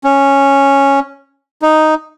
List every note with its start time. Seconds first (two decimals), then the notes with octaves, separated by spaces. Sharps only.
0.04 C#4
1.62 D#4